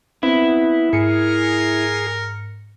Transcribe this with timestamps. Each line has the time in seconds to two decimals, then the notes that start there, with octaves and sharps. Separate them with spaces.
0.23 B3 C4 E4
0.93 G#2 G#4 A#4 C#7